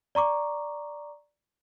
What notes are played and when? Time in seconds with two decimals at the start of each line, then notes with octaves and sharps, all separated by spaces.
0.15 D5 A#5 C#6 D6